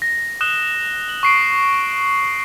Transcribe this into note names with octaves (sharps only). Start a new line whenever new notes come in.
A#6
D#6 F#6 E7 G7
F#7
C#6 C7 D7